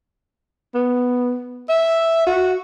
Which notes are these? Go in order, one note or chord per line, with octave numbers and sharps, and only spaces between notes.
B3
E5
F#4